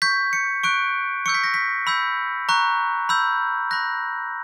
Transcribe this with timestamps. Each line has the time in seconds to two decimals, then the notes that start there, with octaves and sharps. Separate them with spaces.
0.02 C#6 G6 B6
0.33 C#7
0.63 C#6 F#6 D7
1.26 C#6 E6 G6 C#7
1.34 B6
1.44 A#6
1.54 B6
1.87 B5 E6 G6
2.49 A#5 C#6 F#6
3.09 B5 E6 G6
3.71 B5 F#6 A#6